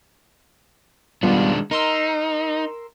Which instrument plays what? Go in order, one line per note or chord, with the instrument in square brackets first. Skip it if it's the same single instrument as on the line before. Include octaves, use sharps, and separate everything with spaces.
[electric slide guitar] D#3 G#3 D4 [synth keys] G3 B3 F4
[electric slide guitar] D#4 [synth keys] A#4 C6 E6